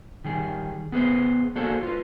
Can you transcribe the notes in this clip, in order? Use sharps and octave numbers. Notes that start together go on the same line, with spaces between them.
D#3 G3 G#4
B3 G#4 B4 C5
A#3 D4 F#4 G#4 A4 C5
F4 B4